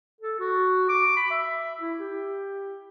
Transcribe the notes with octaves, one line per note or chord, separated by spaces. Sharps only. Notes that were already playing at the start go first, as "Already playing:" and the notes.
A4
F#4
D6
B5
E5
E4
G4